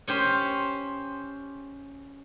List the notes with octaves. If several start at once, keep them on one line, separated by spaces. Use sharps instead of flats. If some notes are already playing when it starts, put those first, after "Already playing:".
C#4 G4 C5